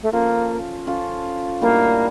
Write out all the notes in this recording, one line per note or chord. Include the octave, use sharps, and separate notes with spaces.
A3
F3 A#3 C#4 F4 A4
F3 C#4 F4 A4
A2 G3 A#3 D4